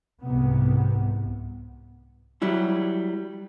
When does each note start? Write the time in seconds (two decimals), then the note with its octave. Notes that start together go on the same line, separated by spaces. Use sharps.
0.22 C2 G#2 C3 B3
2.42 F#3 G3 E4